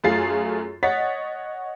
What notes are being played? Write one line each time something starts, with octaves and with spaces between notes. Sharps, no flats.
F#2 A3 F4 G#4 A6 C7
C#5 D#5 F#5 A6 B6